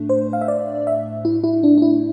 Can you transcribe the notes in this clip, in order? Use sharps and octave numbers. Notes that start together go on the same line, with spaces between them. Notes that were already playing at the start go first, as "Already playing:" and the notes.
Already playing: A2 A3 D4
C5
F5
E5
D5
E5
E4
E4
D4
D4
E4